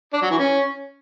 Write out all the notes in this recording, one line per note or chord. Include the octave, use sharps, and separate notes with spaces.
D4
F#3
E3
C#4